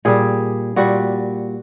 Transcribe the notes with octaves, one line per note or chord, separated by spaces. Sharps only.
A#2 G3 G#4
A#2 G3 F#4